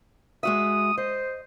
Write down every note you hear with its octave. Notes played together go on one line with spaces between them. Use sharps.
G#3 F#4 E5 D#6
C5 D#5